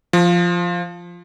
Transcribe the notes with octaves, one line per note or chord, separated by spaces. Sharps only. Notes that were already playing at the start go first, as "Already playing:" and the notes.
F3